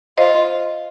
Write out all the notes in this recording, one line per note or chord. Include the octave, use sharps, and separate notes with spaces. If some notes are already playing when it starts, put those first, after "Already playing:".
F4 C5 D#5